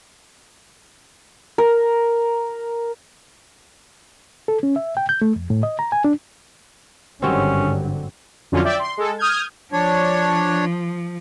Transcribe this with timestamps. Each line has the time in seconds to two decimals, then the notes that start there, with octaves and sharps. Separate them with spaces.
1.58 A#4
4.48 A4
4.63 C#4
4.76 E5
4.97 G5
5.09 G6
5.22 A3
5.36 F2
5.50 A2
5.63 D#5
5.79 A#5
5.92 G#5
6.04 D4
7.22 G1 G#2 D3 D#3 F#3 G3 C4 C#4
8.52 F2 D3 F#3 C#4 F4
8.64 D5 E5 G5
8.79 C6
8.97 G#3 A4
9.18 D#6 F6 G6 G#6
9.72 F3 D4 C#5